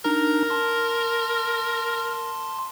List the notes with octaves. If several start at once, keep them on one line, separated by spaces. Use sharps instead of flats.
D4 D#4 A#4 A#5
A5 C6